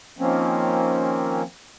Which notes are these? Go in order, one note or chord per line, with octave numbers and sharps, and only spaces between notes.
D#3 F3 A#3 C4 C#4